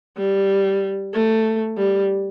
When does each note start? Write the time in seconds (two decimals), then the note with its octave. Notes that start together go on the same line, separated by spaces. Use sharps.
0.18 G3
1.14 A3
1.77 G3